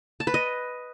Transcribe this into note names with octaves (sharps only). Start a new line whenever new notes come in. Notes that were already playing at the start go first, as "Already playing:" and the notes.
A5
B4
D#5